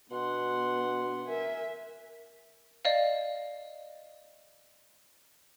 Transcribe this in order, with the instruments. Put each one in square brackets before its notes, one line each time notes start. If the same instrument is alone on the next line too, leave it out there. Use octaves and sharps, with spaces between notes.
[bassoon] B2 [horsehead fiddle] B3 D4 [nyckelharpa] F#5 C6
[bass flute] A#4 [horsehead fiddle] E5 G#5
[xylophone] D5 D#5 F5